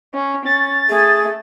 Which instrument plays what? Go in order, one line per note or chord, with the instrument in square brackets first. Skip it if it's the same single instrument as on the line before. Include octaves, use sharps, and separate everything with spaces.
[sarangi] C#4
[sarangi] C#4 [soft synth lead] A6
[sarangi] A3 [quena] G#4